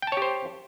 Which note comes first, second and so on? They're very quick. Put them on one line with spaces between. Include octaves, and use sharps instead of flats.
G5 A5 C#5 G4 C5